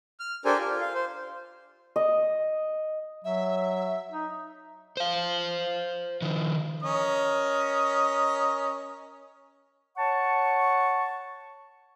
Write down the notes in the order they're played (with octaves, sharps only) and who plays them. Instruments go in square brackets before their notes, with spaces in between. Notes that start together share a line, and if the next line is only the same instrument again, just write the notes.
[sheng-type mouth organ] F6
D4 G4 A4 A#4 C5 G#5
F4
F5
C5
[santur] D#5
[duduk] F#3 [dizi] E5
[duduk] D#4
[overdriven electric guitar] C5 F5
D#3 F3
[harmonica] C#4 A#4 D#5
[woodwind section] C#5 F#5 A5 C#6